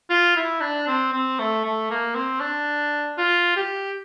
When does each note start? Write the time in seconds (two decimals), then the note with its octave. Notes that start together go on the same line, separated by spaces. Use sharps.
0.10 F4
0.36 E4
0.61 D4
0.87 C4
1.12 C4
1.39 A3
1.65 A3
1.90 A#3
2.15 C4
2.40 D4
3.18 F4
3.56 G4